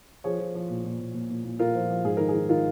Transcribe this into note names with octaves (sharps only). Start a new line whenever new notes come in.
F3 G#4 C#5
F3
F3
A#2
A#2
A#2
A#2
A#2
A#2
A#2 F4 A#4
F3
F3
G#2 G#4
D#3 A#4
G#4
D#3
D#3 F4 A#4